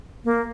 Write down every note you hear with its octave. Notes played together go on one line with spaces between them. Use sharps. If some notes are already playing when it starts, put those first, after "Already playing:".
A#3